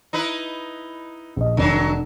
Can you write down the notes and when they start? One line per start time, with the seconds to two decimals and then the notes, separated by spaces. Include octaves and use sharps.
0.13 D#4 E4 B4
1.36 A#1 D#5
1.57 F1 D#3 F#3 D4